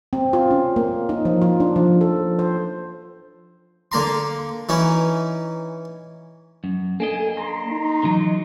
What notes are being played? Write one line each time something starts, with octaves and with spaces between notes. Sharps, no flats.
C4
F4
C#4
A#3
D#4
F3
F4
D4
F3
A4
C5
D3 A#3 A#5 C6
E3 C#4 D#4
F#2
A#3 D4 A4 D#5 G#5
A#5 C6
D#4
D3 E3 F#3